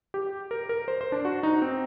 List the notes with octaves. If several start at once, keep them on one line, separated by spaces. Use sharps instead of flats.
G4
A#4
A#4
C5
C5
D4
F#4
D#4
C4